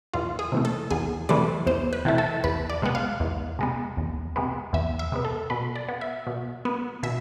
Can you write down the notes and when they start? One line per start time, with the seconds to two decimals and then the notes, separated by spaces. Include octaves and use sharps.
0.14 E2 F4
0.39 G#4
0.52 C3 E3 A3
0.65 A4
0.91 E2 G#4
1.29 C3 E3 A3 D5
1.67 E2 C5
1.93 B4
2.05 C3 E3 A3
2.18 A4
2.44 E2 B4
2.70 D5
2.82 C3 G#3 B3
2.95 F5
3.20 E2
3.59 C3 G#3 B3
3.97 E2
4.36 C3 G#3 B3
4.73 E2 E5
4.99 E5
5.12 C3 G#3 B3
5.25 A4
5.50 B2 B4
5.76 D5
5.88 B3
6.01 E5
6.27 B2
6.65 B3
7.03 B2 E5